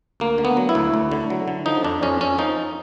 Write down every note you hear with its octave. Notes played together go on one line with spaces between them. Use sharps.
D2 A#3
D3
B3
F#3
E4
D2
D2
D3
F#3
D3
F3 D#4
F2 D4
F2 C#4
F2 C#4
F3 D#4